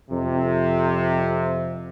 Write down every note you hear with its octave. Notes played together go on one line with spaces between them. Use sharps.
F2 C3